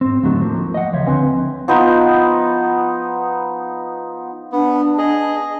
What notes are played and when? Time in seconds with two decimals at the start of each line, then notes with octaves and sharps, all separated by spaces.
0.01 G#2 C4
0.23 D#2 A2 D3 F#3 A3 D#4
0.42 F3 A#3
0.74 D#5 F#5
0.93 C#2 F3 C#5 E5
1.07 D2 D3 C4 B4 G#5 C6
1.68 F3 B3 D#4
4.52 B3 D4
4.98 G#4 D#5